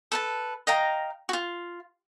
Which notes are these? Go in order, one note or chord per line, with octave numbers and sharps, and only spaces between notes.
A4 B4 A5
D#5 F5 G5 A#5
F4 F#4